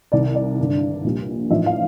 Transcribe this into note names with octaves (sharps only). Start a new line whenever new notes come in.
C2 C3 D#3 D5
D5
G#1 G2 D3
A#1 A#2 G3
A1 G#2 F3 A#3 D4 E5
F5